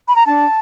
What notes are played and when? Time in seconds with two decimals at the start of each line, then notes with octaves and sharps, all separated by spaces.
0.08 B5
0.17 A#5
0.26 D4 A5